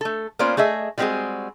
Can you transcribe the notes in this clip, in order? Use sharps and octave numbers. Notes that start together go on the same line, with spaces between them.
A3 A4
A#3 B3 C#4 F4 C5 D5
A3 G#4 D#5 E5
G3 G#3 B3 C4 F#4 G#4